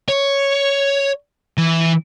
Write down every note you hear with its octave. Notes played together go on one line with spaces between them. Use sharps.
C#5
E3